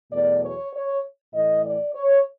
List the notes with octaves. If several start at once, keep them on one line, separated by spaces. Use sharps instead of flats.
E2 B2 F#3 A3 D5
C#5
C#5
A2 E3 A3 D#5
D5
C#5